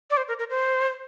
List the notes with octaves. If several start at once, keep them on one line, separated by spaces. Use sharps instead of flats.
D5
C5
A#4
A#4
C5